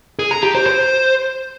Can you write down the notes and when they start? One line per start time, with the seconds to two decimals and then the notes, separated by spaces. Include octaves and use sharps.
0.19 G#4
0.31 A#5
0.43 G4
0.55 C5
0.66 C5